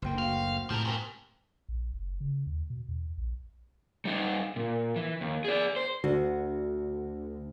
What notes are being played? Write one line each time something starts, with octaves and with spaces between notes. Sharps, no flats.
F#1 D2 A#3 C5 G5 C6
F#4 F5
A2 C3 F3 A#4 E5 A5
G#2 A#3 C4 C#6
A#1
F#1
C#3
D#2
B2
E2
A#1
G3 D#4
A#2
E3
D#2
G#4 D5
C5
D2 D3 F#4